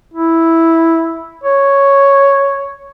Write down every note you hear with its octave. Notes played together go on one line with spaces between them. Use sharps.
E4
C#5